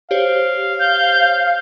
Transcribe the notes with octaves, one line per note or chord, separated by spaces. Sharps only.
G4 C5 C#5 F5
G6